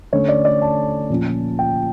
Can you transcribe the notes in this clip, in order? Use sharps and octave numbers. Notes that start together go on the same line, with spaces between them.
D3 A3 C#4 C#5
D5
D5
A5
A#2 F3 C#4
G5